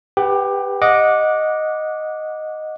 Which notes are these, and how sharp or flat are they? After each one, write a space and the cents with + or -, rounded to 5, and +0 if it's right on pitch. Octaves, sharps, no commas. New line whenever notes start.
G4 +20 B4 +0 F#5 +45
D#5 +0 F#5 -20 D6 +0